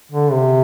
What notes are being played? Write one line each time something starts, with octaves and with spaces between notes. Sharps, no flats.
D3
C3